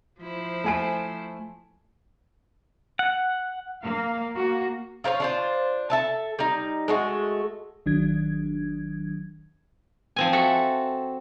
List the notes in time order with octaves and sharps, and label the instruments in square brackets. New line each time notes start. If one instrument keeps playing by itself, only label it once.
[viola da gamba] F3 E4 C5
[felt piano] A3 G#5 D7
[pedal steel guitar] F#5
[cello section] A#3 F5
A#3 F#4
[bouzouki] F4 A#4 C5 C#5
D4 F4 C5
A4 E5 A5
G3 D#4
G#3 A3 F#4
[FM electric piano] G#1 D#3 F#3 D4 G#6
[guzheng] F3 C4 G#5
F#4 A4 E5 F#5